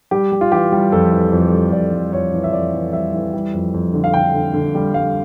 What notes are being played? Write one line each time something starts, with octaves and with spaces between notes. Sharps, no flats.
G3 G4
G3
F4
E3 G4
G3
F2 A4
E3
F2
G3
F2 D5
G3
F2 C#5
E3
E5
F2 D5
E3
G3 E5
E3
G3
F2
F2
D3
F5
D3 G5
D3
D3
G3
G3 F5